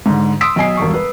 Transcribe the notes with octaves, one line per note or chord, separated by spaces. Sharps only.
G#2 D3
C6 D#6 E6 B6 D7
B1 D#5 G#5 C7
E1 G2 C#6
B4